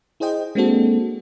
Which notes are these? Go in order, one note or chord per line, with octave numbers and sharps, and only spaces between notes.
E4 G#4 C5 D#5 G5
G#3 A#3 C4 D4 F#4 A4